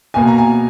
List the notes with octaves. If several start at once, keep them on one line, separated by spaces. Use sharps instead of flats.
B2 A#3 G#5
A#5
G#5